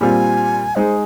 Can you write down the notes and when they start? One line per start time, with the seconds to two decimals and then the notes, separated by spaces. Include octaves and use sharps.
0.01 A#2 G3 C4 F4 G#5
0.76 G#3 D#4 G#4 C5